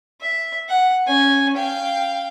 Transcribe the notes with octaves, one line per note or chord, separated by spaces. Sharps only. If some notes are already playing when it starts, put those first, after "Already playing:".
E5
F#5
C#4 G#5
F5 G5